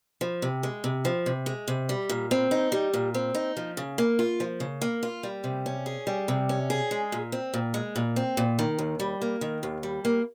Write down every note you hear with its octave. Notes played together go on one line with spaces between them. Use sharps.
F3
C3
G#3
C3
F3
C3
G#3
C3
G3
A#2
C4
D#4
G3
A#2
C4
D#4
F3
C#3
A#3
F4
F3
C#3
A#3
F4
G3
C3
C#4
G#4
G3
C3
C#4
G#4
G#3
A#2
C4
A#2
G#3
A#2
C4
A#2
D#3
D#2
G3
A#3
D#3
D#2
G3
A#3